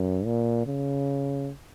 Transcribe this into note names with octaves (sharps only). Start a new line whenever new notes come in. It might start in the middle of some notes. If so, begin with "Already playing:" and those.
Already playing: F#2
A#2
C#3